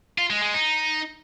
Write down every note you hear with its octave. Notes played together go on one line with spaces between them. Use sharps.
F4
G#3
G#3
D#4